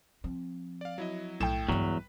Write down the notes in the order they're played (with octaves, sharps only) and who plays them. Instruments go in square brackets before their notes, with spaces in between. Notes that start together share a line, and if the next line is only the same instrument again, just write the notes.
[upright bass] F3 C4
[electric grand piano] D5 F5
F#3 E4 D#5
[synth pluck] B1 G5 [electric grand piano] A2 A4 E7
[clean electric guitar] E2 F#3 [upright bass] G2 G#3 [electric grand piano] B4